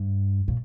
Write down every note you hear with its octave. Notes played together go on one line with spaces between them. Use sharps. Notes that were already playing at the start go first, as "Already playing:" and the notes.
Already playing: G2
A#2